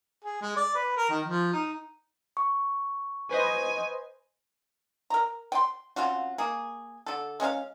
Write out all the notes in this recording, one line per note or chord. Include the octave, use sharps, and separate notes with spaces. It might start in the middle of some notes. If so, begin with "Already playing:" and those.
G#4
G#3
D5
B4
A#4
D#3
F3
D#4
C#6
B4 C5 D#5 G#5
A#4 A#5
G5 C6
C#3 C4 F4 F#4
A#3 G#4
D3 A4
G#3 C#4 A4 F5